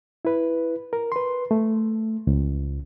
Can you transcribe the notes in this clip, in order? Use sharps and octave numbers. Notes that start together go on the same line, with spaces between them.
E4 B4
A#4
B4 C6
A3
C#2